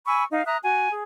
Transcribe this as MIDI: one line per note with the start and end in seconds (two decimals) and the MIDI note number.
0.05 0.23 80
0.05 0.23 83
0.05 0.23 85
0.05 0.23 88
0.31 0.44 63
0.31 0.44 77
0.46 0.57 76
0.46 0.57 82
0.46 0.57 87
0.46 0.57 90
0.62 0.88 66
0.62 0.88 80
0.91 1.03 68